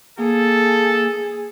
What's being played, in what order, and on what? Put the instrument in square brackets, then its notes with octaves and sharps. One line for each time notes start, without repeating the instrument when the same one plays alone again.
[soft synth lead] A#3 [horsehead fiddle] G#4 [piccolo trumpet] A4